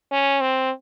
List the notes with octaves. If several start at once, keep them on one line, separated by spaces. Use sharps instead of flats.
C#4
C4